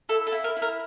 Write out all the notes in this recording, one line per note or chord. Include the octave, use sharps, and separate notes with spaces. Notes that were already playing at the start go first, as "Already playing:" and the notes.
E4 A4
A4
E4
A#4
E4
A#4